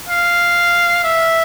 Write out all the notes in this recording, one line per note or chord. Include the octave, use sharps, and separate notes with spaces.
F5
E5